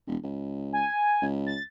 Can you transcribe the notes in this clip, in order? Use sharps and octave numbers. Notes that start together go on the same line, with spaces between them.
E1
C#2
G#5
C#2
A6